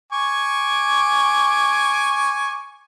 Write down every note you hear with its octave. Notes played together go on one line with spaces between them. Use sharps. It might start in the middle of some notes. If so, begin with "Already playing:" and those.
G#5 C#6 D6